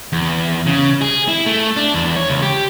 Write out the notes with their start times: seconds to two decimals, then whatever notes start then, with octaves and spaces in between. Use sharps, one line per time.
0.12 E2
0.66 C#3
1.02 G#4
1.28 E4
1.46 A3
1.76 D4
1.94 E2
2.16 C#5
2.29 C#2
2.42 G4